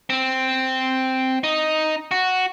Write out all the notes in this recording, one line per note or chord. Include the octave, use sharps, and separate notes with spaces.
C4
D#4
F#4